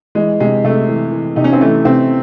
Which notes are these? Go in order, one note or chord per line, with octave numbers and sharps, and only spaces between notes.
E3 G#3
C3 G#3
C3 A3
E3
E3
C3 D#4
C#4
C4
E3 A3
C3 C4